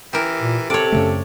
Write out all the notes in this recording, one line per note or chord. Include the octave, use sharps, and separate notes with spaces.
E3 G4 A#4
A#2
C3 A4 C#5 D5
F#2 C#3 A3